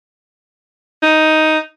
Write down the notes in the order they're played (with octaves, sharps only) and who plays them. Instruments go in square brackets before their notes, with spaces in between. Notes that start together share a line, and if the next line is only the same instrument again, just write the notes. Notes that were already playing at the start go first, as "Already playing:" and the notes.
[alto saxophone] D#4